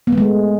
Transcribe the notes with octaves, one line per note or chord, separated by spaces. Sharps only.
B3
A3
G#3